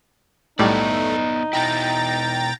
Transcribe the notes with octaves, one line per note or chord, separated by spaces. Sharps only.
B1 A2 G3 A3 B3 D#4 D5
B2 E4 G5 A#5 A6